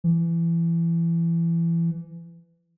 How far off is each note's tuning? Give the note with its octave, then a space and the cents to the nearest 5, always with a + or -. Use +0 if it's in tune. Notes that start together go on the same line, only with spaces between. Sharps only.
E3 +25